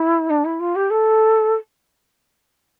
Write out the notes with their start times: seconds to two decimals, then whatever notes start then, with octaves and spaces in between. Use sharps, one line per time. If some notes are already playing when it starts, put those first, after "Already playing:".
Already playing: E4
0.30 D4
0.44 E4
0.60 F4
0.75 G4
0.90 A4